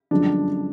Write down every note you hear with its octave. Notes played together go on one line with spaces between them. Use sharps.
G1 F#2 D3 F3 G#3 D4